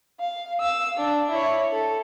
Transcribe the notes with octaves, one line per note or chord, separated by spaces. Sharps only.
F5
F5 E6
D4
E4 C#5
A4